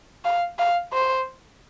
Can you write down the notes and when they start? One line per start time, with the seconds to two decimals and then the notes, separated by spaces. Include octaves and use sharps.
0.25 F5
0.59 F5
0.93 C5